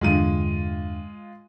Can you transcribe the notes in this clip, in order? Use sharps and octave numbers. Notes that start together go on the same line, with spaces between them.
E2 G2 D3 G#3 F4 D#7